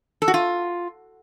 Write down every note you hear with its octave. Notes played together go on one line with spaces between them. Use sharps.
A4
F#4
F4